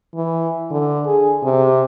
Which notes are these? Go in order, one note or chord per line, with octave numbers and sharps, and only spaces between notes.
E3
D3
G#4
C3